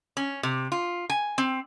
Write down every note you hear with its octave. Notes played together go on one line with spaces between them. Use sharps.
C#4
C3
F4
G#5
C4